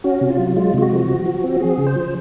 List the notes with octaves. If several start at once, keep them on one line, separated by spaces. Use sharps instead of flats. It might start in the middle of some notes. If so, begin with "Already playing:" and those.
C#4 F#4
C3
F4
F#3
G#3 F4
C3 F4
F#4
F3
F3
F3
C4
C4 G#4
C#3
C5
F3